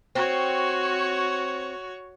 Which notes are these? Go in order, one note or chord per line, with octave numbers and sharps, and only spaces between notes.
C4 F#4 C#5